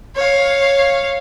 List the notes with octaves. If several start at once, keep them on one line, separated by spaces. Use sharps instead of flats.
C#5 F5